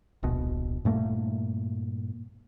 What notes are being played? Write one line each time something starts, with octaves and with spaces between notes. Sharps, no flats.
D1 A#1 B2
G2 A#2 A3 A#3